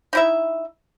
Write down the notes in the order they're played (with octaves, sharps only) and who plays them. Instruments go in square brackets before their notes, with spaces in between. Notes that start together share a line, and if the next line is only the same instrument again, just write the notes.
[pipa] D#4 E4 E5